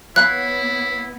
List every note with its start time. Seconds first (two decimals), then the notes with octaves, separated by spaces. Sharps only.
0.16 B3 E4 C#5 F5 B5 F#6